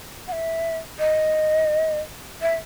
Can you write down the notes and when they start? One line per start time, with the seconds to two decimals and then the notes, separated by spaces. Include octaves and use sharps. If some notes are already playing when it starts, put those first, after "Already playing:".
0.28 F#5
0.32 E5
0.99 D#5
2.42 E5